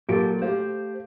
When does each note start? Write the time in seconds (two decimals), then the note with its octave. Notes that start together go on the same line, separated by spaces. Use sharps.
0.09 A#2 F#3 G4 A4 D7
0.42 A3 G4 C5 F5